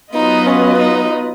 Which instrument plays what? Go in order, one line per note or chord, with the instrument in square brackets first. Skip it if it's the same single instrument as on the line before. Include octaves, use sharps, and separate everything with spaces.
[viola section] F#3 B3 F4 B4 D#5 [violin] D#4
[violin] C#4
D#4